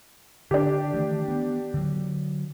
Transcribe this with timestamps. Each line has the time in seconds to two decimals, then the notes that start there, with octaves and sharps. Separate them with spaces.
0.51 D3 D4 G4
0.94 D#3 E3 A3
1.28 B3
1.74 D3 F#3